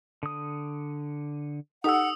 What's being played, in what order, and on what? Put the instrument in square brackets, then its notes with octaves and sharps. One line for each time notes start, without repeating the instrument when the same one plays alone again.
[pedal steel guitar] D3 D#6
[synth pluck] D#4 G4 A4 [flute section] F#5 [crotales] D#6 E6